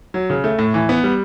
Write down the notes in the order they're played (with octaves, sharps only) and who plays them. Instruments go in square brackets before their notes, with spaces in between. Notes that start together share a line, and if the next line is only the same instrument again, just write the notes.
[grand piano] F#3
C#3
A3
A2
E3
B3
G3